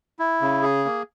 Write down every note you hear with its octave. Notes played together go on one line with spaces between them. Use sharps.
E4
C#3
G#4
A#3